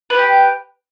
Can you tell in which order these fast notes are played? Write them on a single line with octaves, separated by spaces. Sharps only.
B4 G4 G5